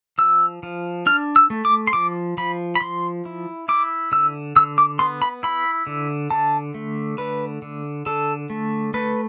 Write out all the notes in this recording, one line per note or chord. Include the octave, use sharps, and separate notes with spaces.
F3 E6
F3
D4 F6
E6
A3
D6
C6
F3 D6
F3 B5
B5
F3 C6
E4
E4 D6
D3 E6
D3 E6
D6
B3 C6
B5
E4 B5
D3
D3 A5
A3
D3 B4
D3
D3 A4
A3
A3 B4